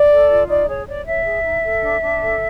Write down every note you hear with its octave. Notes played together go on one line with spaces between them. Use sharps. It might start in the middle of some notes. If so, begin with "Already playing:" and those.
Already playing: D5
A4
F4
D#4 D5
G#4 C#5
C#5 D5
C#5 E5
G#4
D#4
A4
D4
D4
A4